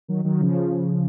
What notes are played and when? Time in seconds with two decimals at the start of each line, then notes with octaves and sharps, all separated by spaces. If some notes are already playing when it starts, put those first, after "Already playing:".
0.08 D#3 F#3
0.24 D#3 F#3
0.41 C#3 F3